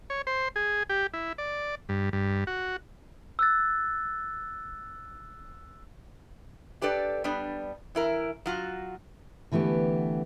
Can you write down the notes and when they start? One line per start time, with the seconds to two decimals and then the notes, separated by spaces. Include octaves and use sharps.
0.10 C#5
0.27 C5
0.56 G#4
0.89 G4
1.13 E4
1.38 D5
1.89 G2
2.13 G2
2.47 F#4
3.39 E6 F#6 A6
6.82 D4 G4 A4 B4 D5
7.24 G3 B3 D4
7.95 E3 E4 A#4
8.46 F#3 F4 F#4
9.52 D3 E3 A3 B3 G4